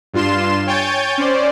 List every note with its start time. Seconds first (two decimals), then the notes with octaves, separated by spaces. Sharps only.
0.13 G2 F4 C6 E7
0.67 C#5 G5 G#5 G6 A6
1.18 C#4 C5 D5